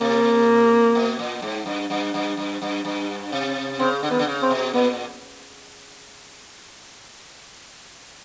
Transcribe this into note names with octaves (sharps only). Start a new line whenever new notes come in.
C3 A#3
B2
A#2
G#2
G2
G2
G2
G2
G2
G2
C3
C#3 C4
D3
D#3 B3
D3
C#3
C4
B2
A#2 B3